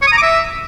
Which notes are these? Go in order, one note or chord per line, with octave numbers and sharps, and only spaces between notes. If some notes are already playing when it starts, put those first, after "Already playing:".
C#5
D#6
A#5
D6
E5